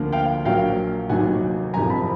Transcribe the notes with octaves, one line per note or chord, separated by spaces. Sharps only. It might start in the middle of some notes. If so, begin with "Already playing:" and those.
Already playing: D2 D3 F3 A#3
F5 G5
A#1 A#2 F#3 A#3 F5 G5
F1 D#2 D#3 F#3 F#5 G#5
F#1 F2 C3 F3 G#5 A#5
A5 B5